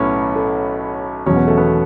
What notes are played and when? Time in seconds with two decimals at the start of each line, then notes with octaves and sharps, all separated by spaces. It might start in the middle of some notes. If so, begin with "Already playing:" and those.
Already playing: B1 A2 B3 C#4
0.36 A3
1.26 E1 E2 B2 F#3 C#4
1.36 B3
1.48 A3
1.57 B3